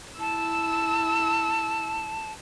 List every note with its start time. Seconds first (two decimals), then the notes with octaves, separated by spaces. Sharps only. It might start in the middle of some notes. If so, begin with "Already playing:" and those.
0.20 E4 A5 E6